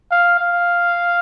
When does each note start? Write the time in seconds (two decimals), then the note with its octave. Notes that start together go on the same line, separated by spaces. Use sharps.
0.11 F5
0.40 F5